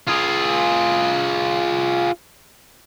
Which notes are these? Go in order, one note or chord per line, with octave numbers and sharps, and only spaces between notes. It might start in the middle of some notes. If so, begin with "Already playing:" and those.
F4 G#4